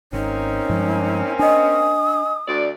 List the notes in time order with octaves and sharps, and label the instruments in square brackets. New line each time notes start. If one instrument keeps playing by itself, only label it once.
[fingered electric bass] G#1 [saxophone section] A#3 C4 C#4 [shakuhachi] D#4
[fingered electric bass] G2 F3 G#3
[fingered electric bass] D4 [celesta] D#5 G#5 [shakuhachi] D#6
[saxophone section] D2 D5